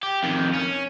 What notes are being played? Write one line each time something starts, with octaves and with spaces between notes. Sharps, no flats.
G4
F2 D#3
C#4